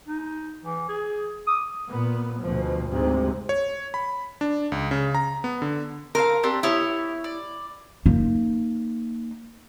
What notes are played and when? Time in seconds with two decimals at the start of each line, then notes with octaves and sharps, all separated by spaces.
0.08 D#4
0.65 E3
0.89 G#4
1.47 D#6
1.88 A#2 B3
2.42 D2 B2 F3
2.89 D2 G#2 C3 G#3
3.49 C#5
3.94 B5
4.41 D4
4.72 C#2
4.91 C#3
5.15 A#5
5.44 B3
5.62 D3
6.15 C4 A#4 F5
6.43 C4 D4 G4
6.63 B3 E4 G4 C#5
7.24 D5
8.06 A#3 D#4